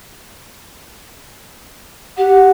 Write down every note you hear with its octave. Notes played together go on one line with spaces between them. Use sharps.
G4 F#5